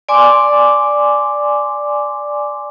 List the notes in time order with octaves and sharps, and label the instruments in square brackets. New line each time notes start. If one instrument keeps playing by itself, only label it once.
[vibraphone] D5 G#5 C6 D6